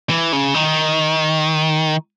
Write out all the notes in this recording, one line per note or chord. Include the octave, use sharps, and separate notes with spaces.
E3
C#3
D#3